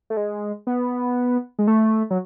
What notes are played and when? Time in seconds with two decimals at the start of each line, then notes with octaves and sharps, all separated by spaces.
0.10 A3
0.17 G#3
0.67 B3
1.59 G#3
1.67 A3
2.11 F#3